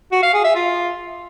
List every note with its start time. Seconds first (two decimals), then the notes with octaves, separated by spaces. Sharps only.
0.12 F#4
0.23 F5
0.34 G#4
0.44 E5
0.55 F4